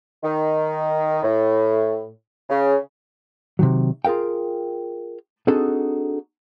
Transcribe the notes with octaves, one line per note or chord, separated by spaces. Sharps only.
D#3
A2
C#3
C3 D#3 F#3
F4 G#4 A#4 F5 G5
C4 D4 D#4 F#4 G#4 A4